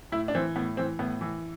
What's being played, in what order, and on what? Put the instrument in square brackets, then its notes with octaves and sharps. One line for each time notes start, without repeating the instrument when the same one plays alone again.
[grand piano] A2 E4
D4
E3 C4
A2 B3
E3 C4
A2 B3
E3